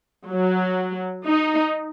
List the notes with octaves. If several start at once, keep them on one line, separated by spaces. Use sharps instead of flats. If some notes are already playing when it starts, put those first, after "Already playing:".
F#3
D#4